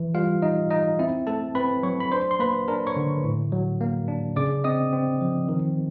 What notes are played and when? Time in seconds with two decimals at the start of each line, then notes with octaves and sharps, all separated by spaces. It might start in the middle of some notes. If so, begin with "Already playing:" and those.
Already playing: E3
0.15 G3 F4 F5
0.42 D#4 D#5
0.70 D#4 D#5
0.99 C4 E4 E5
1.27 A3 A4 A5
1.55 C4 B4 B5
1.83 F#3 C#5 C#6
2.00 B5
2.12 D4 C5 C6
2.31 C6
2.39 A#3 B4 B5
2.68 D4 A#4 A#5
2.87 C#5 C#6
2.97 D3
3.24 A2
3.52 F#3
3.81 A#3
4.08 D4
4.36 C#3 D5 D6
4.64 C4 D#5 D#6
4.93 C4
5.21 F3
5.49 D#3